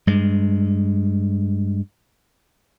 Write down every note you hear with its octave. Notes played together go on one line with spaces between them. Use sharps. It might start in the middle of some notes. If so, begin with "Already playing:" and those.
G2 G#3